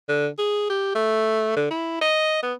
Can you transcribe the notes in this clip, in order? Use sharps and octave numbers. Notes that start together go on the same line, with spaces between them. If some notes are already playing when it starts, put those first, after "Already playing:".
D3
G#4
G4
A3
D3
E4
D#5
B3